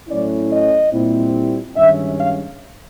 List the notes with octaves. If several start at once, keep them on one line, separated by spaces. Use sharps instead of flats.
A2 F#3 A3 C#4 E4 D5
D#5
A#2 G3 C4 E4
G2 D#3 G#3 C#4 E5
F5